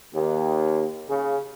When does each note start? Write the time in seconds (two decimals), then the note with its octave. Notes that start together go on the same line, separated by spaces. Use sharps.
0.13 D#2
1.09 C#3